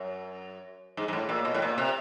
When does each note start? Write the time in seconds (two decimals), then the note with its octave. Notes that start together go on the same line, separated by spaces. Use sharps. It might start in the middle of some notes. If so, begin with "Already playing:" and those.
Already playing: F#2
0.97 G#2
1.08 G#2
1.13 A2
1.29 A#2
1.45 B2
1.54 A2
1.62 A#2
1.78 C3